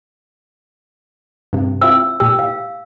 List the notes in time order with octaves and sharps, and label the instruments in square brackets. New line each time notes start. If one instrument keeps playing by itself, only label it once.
[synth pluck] G2 C3
[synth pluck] C4 E4 F4 [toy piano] E6
[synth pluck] A#2 G4 [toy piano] E6
[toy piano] F5